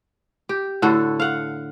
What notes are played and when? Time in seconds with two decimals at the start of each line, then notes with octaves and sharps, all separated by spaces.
0.49 G4
0.82 A2 D3 F#4 A4
1.20 F5 F#5